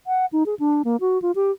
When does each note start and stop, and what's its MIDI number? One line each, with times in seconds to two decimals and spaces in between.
0.07 0.26 78
0.33 0.44 63
0.46 0.55 68
0.59 0.82 62
0.85 0.97 58
1.01 1.21 66
1.22 1.32 65
1.35 1.51 67